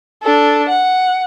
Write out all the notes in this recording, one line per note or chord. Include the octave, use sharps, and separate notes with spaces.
D4 A4
F#5